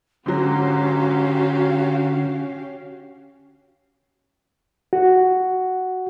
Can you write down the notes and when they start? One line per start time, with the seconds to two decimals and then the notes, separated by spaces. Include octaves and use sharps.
0.26 G#2 D3 F#3 C#4 F#4 G4 F5
4.93 F#4